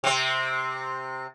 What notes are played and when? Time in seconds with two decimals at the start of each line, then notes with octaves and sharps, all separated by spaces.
0.04 C3 C4